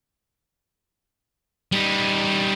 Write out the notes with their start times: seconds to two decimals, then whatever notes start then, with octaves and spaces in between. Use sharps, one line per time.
1.72 G3 D#4